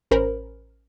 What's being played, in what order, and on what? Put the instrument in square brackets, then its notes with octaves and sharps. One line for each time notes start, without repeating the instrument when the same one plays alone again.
[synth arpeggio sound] A1 C#4 A#4 C5 B5